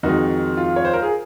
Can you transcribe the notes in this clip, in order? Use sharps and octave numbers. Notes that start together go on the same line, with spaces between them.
F2 D#3 G#3 D#4 F#4
F4
C#5
C5
A#4
G#4